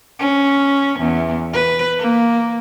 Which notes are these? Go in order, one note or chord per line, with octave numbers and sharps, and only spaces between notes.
C#4
E2
B4
A#3